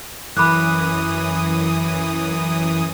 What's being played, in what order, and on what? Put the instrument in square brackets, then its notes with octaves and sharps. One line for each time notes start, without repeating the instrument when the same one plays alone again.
[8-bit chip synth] F#2 E3 D#6 [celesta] B5 D6 F#6